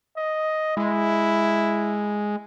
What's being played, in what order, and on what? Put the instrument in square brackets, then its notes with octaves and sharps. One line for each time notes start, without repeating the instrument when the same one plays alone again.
[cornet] D#5
[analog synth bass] G#3 [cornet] E4